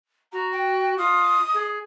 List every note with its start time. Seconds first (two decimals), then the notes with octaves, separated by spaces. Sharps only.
0.32 F#4 A#5
0.52 G5
0.98 F4 D#6
1.54 G#4